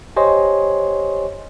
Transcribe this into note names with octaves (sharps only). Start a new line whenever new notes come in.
G4 C5 C#5 D#5 G#5 C6